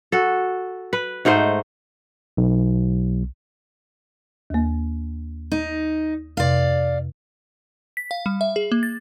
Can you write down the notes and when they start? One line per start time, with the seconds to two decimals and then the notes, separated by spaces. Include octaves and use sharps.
0.12 F#4 A4
0.93 B4
1.25 G#2 A3 D#4 C5
2.37 B1
4.50 D#2 A#3
5.52 D#4
6.37 F2 C3 D5 F5
7.97 B6
8.11 F5
8.26 G3
8.41 E5
8.56 G#4
8.72 A#3
8.83 A6